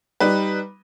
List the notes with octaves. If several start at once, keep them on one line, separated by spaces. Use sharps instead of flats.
G3 D#4 B4